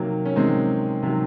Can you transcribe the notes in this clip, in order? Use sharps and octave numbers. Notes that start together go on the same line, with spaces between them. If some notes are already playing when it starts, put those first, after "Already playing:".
Already playing: C3 D#3 F#3 A#3
C#4
C3 D#3 F#3 G#3 C4
C3 D#3 F#3